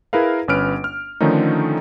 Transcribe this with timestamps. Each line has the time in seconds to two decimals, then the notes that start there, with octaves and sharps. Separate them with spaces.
0.13 E4 G#4 A#4 B4 F5
0.48 G1 C#4 B4 F6 D7
0.84 F6
1.21 D3 D#3 F3 A3 C#4 D#4